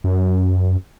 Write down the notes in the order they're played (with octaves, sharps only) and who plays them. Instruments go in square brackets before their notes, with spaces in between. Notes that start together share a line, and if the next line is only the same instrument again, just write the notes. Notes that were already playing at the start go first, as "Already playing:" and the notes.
[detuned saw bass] F#2